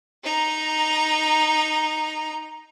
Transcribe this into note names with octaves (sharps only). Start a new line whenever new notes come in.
D#4 A#5